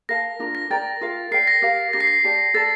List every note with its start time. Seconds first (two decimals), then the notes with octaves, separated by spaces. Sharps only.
0.09 A#4 F5 A5 A#6
0.39 D4 F4 A#4
0.55 A#6
0.70 A#4 D5 G5 A#5 A6
1.01 F4 A#4 F5
1.31 A#4 D5 G5 C7
1.47 A#6
1.62 G4 A#4 F5 A#6
1.93 D4 G4 A#4 A#6
2.01 C7
2.07 A#6
2.24 G4 D5 A5
2.54 A4 D5 A5 A6